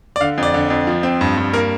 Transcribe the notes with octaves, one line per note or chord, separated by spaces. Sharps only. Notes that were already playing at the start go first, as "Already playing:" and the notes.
D5
D3 F5
F2 D5
D3
F2
F3
C4
G2
G2
A#3 A#4